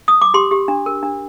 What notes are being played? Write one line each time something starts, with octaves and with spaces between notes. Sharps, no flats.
D#6
D6
G4 C6
G4
D4
A#4
D4